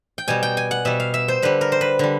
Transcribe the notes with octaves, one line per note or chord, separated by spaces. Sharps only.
G5
B2 G3 G#5
G5
G#5
F#5
B2 G3 E5
F5
E5
C5
D3 G3 B4
A#4
C5
B4
D3 G3